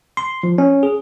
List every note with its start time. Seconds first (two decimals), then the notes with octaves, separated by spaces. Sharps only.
0.17 C6
0.43 F3
0.58 C#4
0.83 G#4